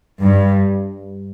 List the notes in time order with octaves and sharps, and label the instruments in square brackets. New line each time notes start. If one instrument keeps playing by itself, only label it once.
[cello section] G2